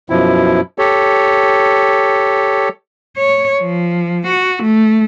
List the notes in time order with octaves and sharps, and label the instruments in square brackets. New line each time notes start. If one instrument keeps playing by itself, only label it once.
[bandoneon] F#2 B2 F3 E4
G4 A4 C#5
[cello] C#5
F3
F#4
A3